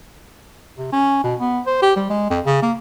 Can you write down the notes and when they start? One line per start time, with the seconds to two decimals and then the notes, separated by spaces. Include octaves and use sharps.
0.78 C3
0.92 C#4
1.24 B2
1.40 B3
1.66 C5
1.82 G4
1.96 G3
2.10 G#3
2.30 F2
2.45 C#3
2.62 A#3